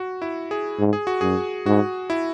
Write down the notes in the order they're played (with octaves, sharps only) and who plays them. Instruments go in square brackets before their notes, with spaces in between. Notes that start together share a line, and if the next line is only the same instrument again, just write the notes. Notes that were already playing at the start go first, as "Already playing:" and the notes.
Already playing: [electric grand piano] F#4
E4
G#4
[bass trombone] G#2
[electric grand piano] G#4
F#4
[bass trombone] F#2 [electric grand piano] G#4
[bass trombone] G#2 [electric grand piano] F#4
[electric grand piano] E4